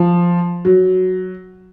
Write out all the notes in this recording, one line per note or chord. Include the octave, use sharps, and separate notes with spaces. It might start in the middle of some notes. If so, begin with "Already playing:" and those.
Already playing: F3
F#3